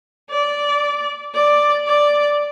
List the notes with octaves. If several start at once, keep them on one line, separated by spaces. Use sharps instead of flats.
D5
D5
D5